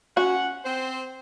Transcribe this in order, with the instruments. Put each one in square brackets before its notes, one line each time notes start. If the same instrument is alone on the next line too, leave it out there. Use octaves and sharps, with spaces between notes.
[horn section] C#4 F#5 [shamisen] F#4
[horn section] C4 C5